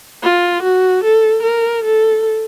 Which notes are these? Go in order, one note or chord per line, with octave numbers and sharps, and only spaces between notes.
F4
F#4
A4
A#4
A4